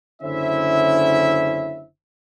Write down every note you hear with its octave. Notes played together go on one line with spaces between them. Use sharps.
F#1 D3 C#4 E4 C5 E5